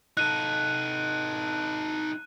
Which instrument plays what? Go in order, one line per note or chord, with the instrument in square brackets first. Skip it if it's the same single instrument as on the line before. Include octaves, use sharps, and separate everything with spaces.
[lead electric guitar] D#4 A4 [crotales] F#6 D#7